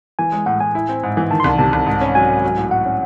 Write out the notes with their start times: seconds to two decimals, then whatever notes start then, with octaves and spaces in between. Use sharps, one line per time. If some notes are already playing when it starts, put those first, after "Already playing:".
0.19 E3 G#5
0.32 G#3
0.46 A2 F#5
0.60 A2 G#5
0.75 E4
0.89 C4
1.03 G#2
1.17 E3
1.30 D#3 A5
1.40 C6
1.44 C2 A5
1.58 C3 A5
1.73 C2
1.86 G#2
2.01 C#4
2.15 F#3 G#5
2.30 G#2
2.44 F#3
2.58 A2
2.71 F#4 F#5
2.85 C#4